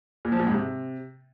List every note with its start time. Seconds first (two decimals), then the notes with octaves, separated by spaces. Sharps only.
0.25 A#2
0.32 F3
0.39 A#2
0.47 G#2
0.54 C3